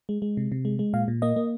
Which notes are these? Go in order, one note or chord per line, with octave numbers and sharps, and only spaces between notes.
G#3
G#3
C3
C3
G#3
G#3
A#2 F5
A#2
A#3 D#5
A#3